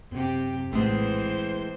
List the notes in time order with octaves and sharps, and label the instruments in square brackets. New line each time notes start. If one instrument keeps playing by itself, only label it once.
[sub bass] F#2 [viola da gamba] C3 G4
[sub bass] A#1 [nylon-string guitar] A2 G#3 B3 [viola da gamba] E3 C5